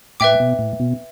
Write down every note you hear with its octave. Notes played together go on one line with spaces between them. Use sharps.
A2 B4 E5 G5 D6
B2
A2
B2